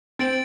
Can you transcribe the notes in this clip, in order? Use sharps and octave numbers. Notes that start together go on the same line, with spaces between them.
C4 A6 D7 F#7